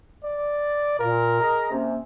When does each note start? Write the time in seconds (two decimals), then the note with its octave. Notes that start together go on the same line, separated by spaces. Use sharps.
0.24 D5
0.99 A#2 A#4
1.41 G#4 D#5 A#5
1.72 C3 A#3 C#4